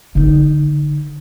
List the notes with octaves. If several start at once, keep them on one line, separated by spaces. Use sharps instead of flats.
D3 D#4